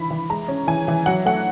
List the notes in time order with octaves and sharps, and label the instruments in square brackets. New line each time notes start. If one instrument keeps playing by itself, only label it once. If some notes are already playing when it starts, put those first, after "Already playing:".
Already playing: [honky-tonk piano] E3 B5
E3
G#3 A#5
C#4
E3 G#5
E3
F#3 F#5
A3 F#5